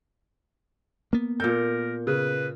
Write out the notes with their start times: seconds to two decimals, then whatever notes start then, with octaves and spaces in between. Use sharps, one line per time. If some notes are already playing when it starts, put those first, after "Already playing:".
1.13 A#3 B3
1.40 A#2 A4 A#4 G6
2.07 C#3 B4